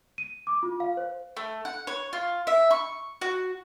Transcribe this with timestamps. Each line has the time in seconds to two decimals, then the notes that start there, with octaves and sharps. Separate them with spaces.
0.18 D#7
0.47 D6
0.63 F4
0.80 F5
0.97 C5
1.37 A3
1.65 F#5
1.87 C#5
2.13 F4
2.47 E5
2.71 C#6
3.21 F#4